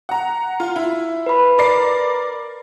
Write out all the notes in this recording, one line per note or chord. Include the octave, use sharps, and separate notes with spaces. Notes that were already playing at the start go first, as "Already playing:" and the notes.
F#5 A#5
F4
E4
B4 B5
A#4 D5 C7